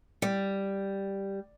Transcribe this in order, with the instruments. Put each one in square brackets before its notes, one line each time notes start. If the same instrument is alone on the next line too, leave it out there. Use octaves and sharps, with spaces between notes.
[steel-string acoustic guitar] G3